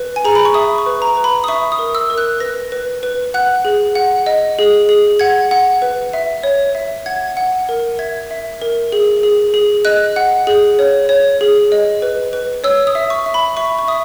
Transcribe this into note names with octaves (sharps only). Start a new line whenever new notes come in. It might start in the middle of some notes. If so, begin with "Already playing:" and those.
Already playing: B4
G#5
G#4 A#5
B5
C#6
E5 D#6
C#6
B4
A#5
B4
B5
D#6
E5 C#6
D#6
A#4
E6
A#4
F#6
B4 A#6
B4
B4
F#5 F#6
G#4
F#5
D#5
G#4
G#4
F#5 G#6
F#5
B4
E5
C#5
E5
F#5 G#6
F#5
A#4
E5 G#6
E5
A#4
G#4
G#4
G#4
D#5 F#6
F#5
G#4
C#5
C#5
G#4
D#5
B4
B4
C#5 E6
D#6
E5
C#6
E5
B5
E5 C#6
C#6
E5 D#6